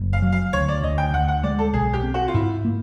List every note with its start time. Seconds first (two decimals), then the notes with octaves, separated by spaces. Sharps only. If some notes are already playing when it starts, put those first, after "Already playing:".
Already playing: F#1
0.13 F5
0.22 F#3
0.32 F5
0.53 D2 C#5
0.68 D5
0.83 D2 D#5
0.98 G5
1.13 D2 F#5
1.28 F#5
1.43 G#3 D5
1.59 A4
1.73 B1 G#4
1.93 G4
2.04 C4
2.14 F#4
2.28 F4
2.34 G#2 E4
2.65 A#3